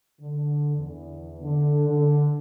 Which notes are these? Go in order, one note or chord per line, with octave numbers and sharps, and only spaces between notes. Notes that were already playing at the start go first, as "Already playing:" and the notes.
D3
E2
D3
D3